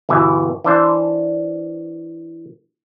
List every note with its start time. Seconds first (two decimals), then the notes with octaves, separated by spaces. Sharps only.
0.09 G1 B2 E3 G#5
0.64 E3 D4 C5